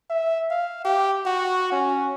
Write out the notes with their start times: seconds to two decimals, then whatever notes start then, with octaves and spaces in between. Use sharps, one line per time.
0.10 E5
0.51 F5
0.85 G4
1.26 F#4
1.72 C#4